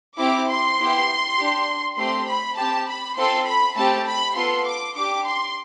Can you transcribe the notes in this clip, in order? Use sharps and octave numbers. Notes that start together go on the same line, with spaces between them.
C4 E4 G4 D6
C6
B3 E4 G4
D4 G4
A3 C4 G4 C6
B5
C4 G4 A5
B5
C4 F4 A4 C6
B5
A3 C4 G4 A5
B5
B3 F4 A4 C6
D6
D4 G4 D6
C6